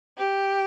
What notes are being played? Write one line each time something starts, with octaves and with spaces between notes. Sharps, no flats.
G4